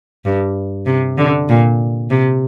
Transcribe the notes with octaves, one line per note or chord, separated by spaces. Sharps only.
G2
C3
D3
A#2
C3